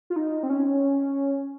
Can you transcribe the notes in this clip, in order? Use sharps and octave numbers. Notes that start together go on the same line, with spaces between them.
F4
D#4
C4
C#4